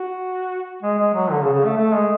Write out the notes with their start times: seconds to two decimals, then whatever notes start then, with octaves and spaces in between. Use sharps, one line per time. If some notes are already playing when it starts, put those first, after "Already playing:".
Already playing: F#4
0.83 G#3
0.98 G#3
1.14 F#3
1.31 D3
1.42 C#3
1.53 C#3
1.65 A3
1.77 A3
1.94 G#3